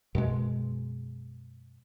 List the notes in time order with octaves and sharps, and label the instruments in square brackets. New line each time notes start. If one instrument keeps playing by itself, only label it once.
[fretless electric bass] F#2 B2 G#3